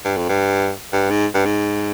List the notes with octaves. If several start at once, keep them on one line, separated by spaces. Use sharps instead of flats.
G2
F2
G2
G2
G#2
G2
G#2